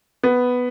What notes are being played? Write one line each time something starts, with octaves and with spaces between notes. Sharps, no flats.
B3